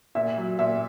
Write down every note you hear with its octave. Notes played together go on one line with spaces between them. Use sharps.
A#2 E5
F#3
A#2 E5